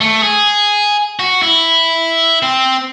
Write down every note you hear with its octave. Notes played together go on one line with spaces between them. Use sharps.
A3
G#4
F#4
E4
C4